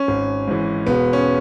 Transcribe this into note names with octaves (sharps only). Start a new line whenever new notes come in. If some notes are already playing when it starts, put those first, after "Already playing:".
Already playing: C#4
G#1
G#2 E3
E1 B3
C#4